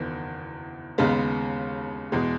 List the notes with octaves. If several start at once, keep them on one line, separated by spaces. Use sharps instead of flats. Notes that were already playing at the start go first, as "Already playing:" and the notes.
Already playing: F#1 E2 D#3
D#2 C#3 G#3 B3
E2 B2 G#3